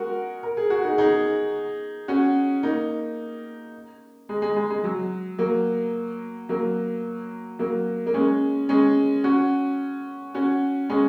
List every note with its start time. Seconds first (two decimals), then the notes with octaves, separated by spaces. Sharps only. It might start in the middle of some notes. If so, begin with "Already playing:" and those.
Already playing: G#3 F#4 A#4
0.43 A#4
0.57 G#4
0.70 F#4
0.83 D#4 G#4
0.98 D#4 G#4
2.08 C#4 F#4
2.63 A#3 D#4
4.29 G#3
4.42 G#3
4.56 G#3
4.70 G#3
4.84 F#3
5.39 F#3 A#3
6.49 F#3 A#3
7.59 F#3 A#3
8.06 A#3
8.14 G#3 C#4
8.69 G#3 C#4
9.24 C#4 F#4
10.34 C#4 F#4
10.89 G#3 C#4